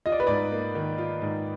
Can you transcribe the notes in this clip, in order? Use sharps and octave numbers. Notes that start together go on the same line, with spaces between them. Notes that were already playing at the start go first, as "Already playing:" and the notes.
F4 D#5
D5
B4
G#2 D5
A#3
D#3
F4
G#2